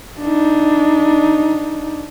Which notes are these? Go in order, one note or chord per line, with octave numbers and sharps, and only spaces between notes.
D4 D#4